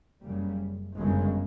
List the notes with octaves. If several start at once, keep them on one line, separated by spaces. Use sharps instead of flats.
F#1 F#2 C#3 G3
G1 F#2 C#3 G#3